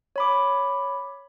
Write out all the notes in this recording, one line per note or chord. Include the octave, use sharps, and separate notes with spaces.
C#5 B5 D6